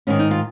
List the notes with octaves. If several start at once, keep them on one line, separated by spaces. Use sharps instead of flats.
G#2 D#3 C#4
D#4
F4